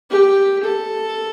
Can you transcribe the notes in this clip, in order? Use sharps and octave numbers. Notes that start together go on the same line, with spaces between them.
G4
A4